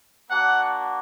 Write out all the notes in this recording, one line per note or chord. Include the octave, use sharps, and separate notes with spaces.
A#3 D4 F#4 F#5